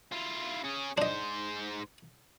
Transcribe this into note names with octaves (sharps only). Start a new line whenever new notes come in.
E4 F4
C#4 G#4
G#2 D4 C5 D#5